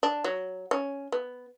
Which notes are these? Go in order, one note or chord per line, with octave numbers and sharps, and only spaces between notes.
D4
F#3
C#4
B3